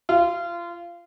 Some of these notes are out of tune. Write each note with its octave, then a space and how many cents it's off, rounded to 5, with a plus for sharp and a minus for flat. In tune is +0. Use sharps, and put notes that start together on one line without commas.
F4 -25